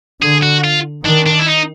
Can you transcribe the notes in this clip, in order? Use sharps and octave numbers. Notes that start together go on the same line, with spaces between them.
D3 G#4
F#4
F4
D#3 D4
D4
E4
D#4